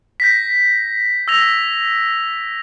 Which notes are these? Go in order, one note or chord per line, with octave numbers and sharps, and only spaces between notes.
G6 A#6 B6
E6 G#6 A#6 F7